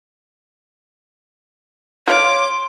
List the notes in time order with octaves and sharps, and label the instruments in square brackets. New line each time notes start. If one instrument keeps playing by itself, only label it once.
[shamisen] F4 F5 [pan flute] C#5 [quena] C6 [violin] D6